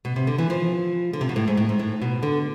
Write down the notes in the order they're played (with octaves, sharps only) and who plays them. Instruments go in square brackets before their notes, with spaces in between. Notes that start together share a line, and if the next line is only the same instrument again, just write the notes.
[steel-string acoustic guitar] B2
C3
D3
E3
F3
D3
C3
B2
A2
G#2
A2
G#2
A2
B2
D3